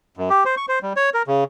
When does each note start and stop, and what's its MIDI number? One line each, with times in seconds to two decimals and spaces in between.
0.17 0.29 42
0.30 0.44 67
0.45 0.55 72
0.57 0.66 85
0.69 0.79 72
0.82 0.93 55
0.96 1.10 73
1.14 1.23 70
1.27 1.44 49